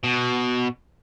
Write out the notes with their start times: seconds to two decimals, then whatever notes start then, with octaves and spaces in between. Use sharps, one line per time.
0.04 B2